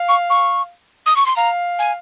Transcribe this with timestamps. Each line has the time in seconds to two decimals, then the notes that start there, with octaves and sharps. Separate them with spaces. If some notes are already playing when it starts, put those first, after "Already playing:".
Already playing: F5
0.08 C#6
0.30 C#6
1.06 D#6
1.16 C#6
1.26 C6
1.36 F5 A#5
1.79 G#5